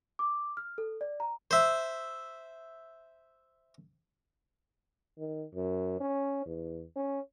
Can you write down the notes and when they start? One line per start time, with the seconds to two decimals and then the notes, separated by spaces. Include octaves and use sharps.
0.19 D6
0.57 F6
0.78 A4
1.01 D5
1.20 A#5
1.51 C5 E5
5.18 D#3
5.55 F#2
6.00 C#4
6.46 E2
6.96 C#4